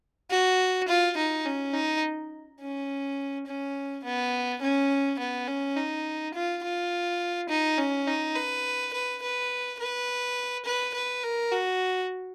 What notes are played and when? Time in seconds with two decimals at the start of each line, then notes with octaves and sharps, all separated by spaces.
0.30 F#4
0.88 F4
1.17 D#4
1.45 C#4
1.74 D#4
2.61 C#4
3.46 C#4
4.04 B3
4.62 C#4
5.19 B3
5.48 C#4
5.76 D#4
6.34 F4
6.63 F4
7.49 D#4
7.78 C#4
8.07 D#4
8.36 B4
8.93 B4
9.22 B4
9.80 B4
10.65 B4
10.94 B4
11.23 A#4
11.52 F#4